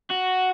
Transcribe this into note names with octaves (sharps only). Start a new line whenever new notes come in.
F#4